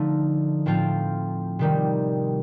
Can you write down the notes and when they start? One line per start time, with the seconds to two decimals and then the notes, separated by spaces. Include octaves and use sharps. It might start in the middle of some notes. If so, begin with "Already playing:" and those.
Already playing: D3 F3 A3 D#4
0.66 A2 F3 C4 F4
1.59 C3 D#3 G3